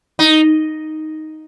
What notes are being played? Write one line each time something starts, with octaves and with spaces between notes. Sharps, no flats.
D#4